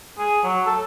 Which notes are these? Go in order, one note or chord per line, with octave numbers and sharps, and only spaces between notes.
G#4
F#3
A4